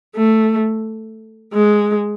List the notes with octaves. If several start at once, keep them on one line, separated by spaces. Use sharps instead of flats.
A3
G#3